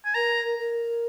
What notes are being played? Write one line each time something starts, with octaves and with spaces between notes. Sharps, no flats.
G#5
A#4 A#5
A#4